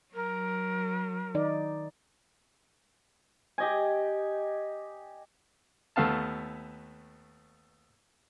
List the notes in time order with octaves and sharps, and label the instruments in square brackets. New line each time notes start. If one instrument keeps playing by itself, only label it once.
[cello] F#3 [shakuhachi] A#4
[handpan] D#3 D#4 D5
[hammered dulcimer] G4 D#5 G#5
[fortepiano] D#2 A3 B3 F5 A5